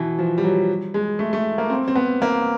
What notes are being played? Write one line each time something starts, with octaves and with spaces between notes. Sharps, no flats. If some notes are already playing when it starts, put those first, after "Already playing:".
Already playing: B2 E3
F3
G3
F#3
G#3
A3
A3
A#3
C4
C4
B3
A#3